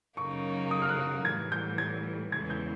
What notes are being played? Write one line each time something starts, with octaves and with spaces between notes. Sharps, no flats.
F#2 C#3 F#3 A#3 D#4 C#6
D#6
F6
F#6
A2 E3 G3 G#6
G6
G#6
E2 C#3 E3 G#3 G#6
G6